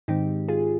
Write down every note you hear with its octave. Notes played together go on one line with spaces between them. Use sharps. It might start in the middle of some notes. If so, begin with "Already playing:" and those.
G#2 D#3 G#3 C4 D#4 G4
F4 G#4